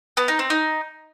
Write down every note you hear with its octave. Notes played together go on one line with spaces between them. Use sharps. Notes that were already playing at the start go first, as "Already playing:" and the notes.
B3
D#4
C4
D#4